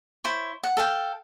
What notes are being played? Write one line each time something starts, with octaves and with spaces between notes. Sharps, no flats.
E4 C5 C#5
F#5
A4 F5 G5